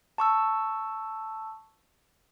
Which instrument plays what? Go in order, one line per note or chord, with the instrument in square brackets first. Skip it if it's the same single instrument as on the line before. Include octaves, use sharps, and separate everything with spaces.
[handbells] A5 C#6 E6